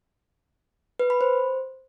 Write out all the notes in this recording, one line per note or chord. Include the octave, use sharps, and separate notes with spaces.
B4
B5
C5